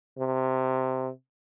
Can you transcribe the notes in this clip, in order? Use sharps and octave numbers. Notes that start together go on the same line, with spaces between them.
C3